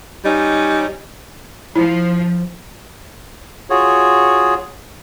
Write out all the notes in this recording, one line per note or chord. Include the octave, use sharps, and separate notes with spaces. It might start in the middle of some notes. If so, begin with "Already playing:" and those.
G3 C#4 D#4
F3 E4
F4 F#4 G#4 C#5